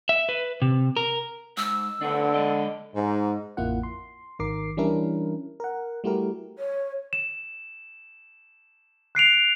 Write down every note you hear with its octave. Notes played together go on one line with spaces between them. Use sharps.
E5
B4
C3
A#4
G#2 E6
D3 A3 B3 D4
G#3 D5 D#5
G#2
A1 F2 A#3 E4 F4 F#5
C6
G#1 D#3 A#4 D6 C7
E3 G3 C#4 D4 E4 A#4
A#4 F#5
G3 A3 E4 F#4 G4 A#4
C#5
E7
F#6 C7 D7 F7